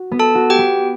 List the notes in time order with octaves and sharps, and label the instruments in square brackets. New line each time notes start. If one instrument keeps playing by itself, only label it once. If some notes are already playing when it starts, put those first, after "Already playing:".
Already playing: [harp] F#4
B3
[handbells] A4 A5
[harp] F#4
[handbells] G4 G5
[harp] B3